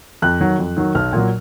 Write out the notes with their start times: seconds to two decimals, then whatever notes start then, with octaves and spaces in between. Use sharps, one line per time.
0.22 F2 F#6
0.40 D#3 F#3
0.58 F2
0.77 D#3 F#3
0.95 B1 F6
1.13 A#2 F#3